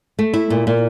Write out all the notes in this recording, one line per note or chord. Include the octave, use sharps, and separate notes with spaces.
A3
E4
A#2
A#2